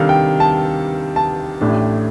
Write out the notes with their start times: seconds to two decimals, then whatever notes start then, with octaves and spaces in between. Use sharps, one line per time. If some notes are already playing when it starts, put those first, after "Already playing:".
Already playing: C3 D#3 G3 D4 A4 F5
0.09 G5
0.40 A5
1.16 A5
1.61 A1 A2 A3 D4 G4